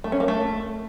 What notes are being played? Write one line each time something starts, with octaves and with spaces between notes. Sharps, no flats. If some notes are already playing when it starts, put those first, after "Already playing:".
A3
C#4
A#3
A3